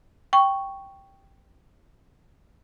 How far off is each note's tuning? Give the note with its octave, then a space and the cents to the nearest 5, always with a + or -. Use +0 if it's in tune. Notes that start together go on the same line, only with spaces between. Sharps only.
G5 +0 C#6 +0